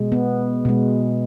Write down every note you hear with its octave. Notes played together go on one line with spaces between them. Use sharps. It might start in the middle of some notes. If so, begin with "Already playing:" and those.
Already playing: B2 G#3
B3
B2 G#3